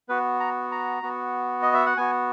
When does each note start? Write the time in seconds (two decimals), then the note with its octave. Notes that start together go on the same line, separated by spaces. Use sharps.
0.09 B3 F#4 B4
0.40 A#5
0.71 A#5
1.03 B3 F#4
1.62 D#5
1.74 E5
1.86 F#5
1.97 B3 F#4 G#5